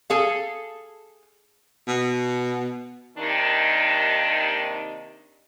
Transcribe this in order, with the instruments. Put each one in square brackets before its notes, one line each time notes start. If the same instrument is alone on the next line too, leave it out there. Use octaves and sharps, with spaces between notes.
[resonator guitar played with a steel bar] G#4 A4 F5
[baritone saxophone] B2
[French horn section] D#2 C3 D#3 D4 D#4